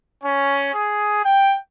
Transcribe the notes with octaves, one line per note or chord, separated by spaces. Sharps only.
C#4
G#4
G5